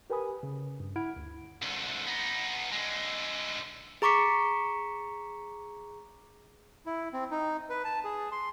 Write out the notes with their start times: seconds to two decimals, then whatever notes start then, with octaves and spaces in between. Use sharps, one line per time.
0.10 G4 A#4 B4 G#5 B5 D#6
0.43 C#3
0.80 G2
0.96 E4 F#5 B5 F6 G#6 D7
1.16 D2
1.62 C2 D3
2.07 B3 D#4
2.72 D3 G#3
4.02 G#4 A#5 C#6 D6 B6 C#7
6.86 E4
7.13 C4
7.31 D#4
7.70 B4
7.84 A5
8.04 G#4
8.32 C6